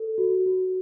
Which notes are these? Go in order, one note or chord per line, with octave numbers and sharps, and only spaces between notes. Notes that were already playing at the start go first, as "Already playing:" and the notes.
Already playing: A4
F#4
F#4